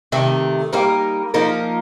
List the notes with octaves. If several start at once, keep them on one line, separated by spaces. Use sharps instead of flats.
C3 D#3 A3
G3 A#3 D#4 A#4
F3 A#3 D#4 A#4